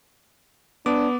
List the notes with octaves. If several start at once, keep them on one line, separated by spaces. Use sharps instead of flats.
B3 D4 D6